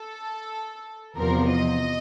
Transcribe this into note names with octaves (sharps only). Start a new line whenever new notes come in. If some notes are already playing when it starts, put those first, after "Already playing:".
Already playing: A4
E2 C3 F3 A#4
D#5